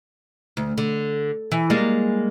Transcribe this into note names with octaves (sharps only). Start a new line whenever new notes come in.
D2
D3
E3
G3 G#3 A#3